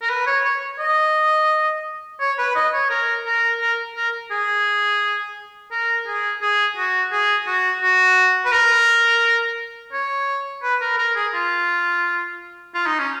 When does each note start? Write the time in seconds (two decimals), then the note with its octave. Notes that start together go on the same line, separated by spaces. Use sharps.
0.02 A#4
0.10 B4
0.27 C#5
0.45 C#5
0.79 D#5
2.20 C#5
2.39 B4
2.55 D#5
2.73 C#5
2.90 A#4
3.26 A#4
3.61 A#4
3.96 A#4
4.31 G#4
5.71 A#4
6.07 G#4
6.42 G#4
6.77 F#4
7.12 G#4
7.47 F#4
7.82 F#4
8.46 B4
8.52 A#4
9.93 C#5
10.63 B4
10.81 A#4
10.98 A#4
11.16 G#4
11.34 F4
12.74 F4
12.86 D#4
12.99 C#4